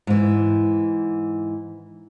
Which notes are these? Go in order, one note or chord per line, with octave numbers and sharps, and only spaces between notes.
G#2 E3